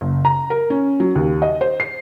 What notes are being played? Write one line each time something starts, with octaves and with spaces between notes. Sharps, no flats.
F#1
A#5
A#4
C#4
F#3
D#2
D#5
C5
C7